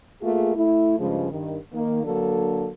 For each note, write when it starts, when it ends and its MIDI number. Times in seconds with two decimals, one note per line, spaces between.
0.22 0.54 57
0.22 0.54 58
0.22 0.54 65
0.22 0.54 68
0.55 0.98 57
0.55 0.98 64
0.99 1.29 43
0.99 1.29 49
0.99 1.29 53
0.99 1.29 56
1.32 1.56 43
1.32 1.56 51
1.72 2.03 51
1.72 2.03 58
2.04 2.69 50
2.04 2.69 54
2.04 2.69 58
2.04 2.69 62
2.04 2.69 69